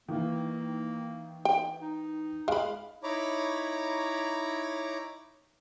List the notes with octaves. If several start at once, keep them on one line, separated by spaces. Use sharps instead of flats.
D#3 E3 A#3
G5
D#4
G#3 F5 B5
D#4 E4 C#5 A#5 B5 D6